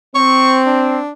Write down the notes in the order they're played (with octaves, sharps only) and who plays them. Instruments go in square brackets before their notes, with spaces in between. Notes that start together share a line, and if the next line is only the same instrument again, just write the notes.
[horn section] C4 [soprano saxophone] C#6
[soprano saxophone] D4